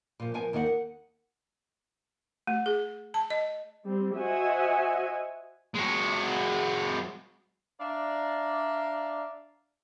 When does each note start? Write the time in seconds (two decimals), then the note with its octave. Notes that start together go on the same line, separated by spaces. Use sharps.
0.20 A#2 F3
0.34 F3 B3 A#4 G#5
0.53 D#2 D#3 A#3 A#4 D5 F#5
0.66 F#5
2.47 A3
2.66 G#4
3.14 A5
3.30 D#5
3.84 G3 C4
4.16 F#4 C5 D#5 E5 F#5 G#5
5.75 G#3 F#4
7.80 D4 D5 E5 F5 A#5